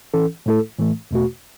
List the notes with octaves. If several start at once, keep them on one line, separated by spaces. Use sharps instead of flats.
E3 C#4 A4
A2 A3 E4 A4
A2 E3 A3
E2 B2 A3 F#4